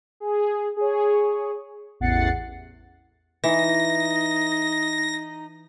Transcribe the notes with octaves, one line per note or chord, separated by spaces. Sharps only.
G#4
G#4 C#5
A1 E2 F#5 A6 C7 C#7
E3 D#4 A#6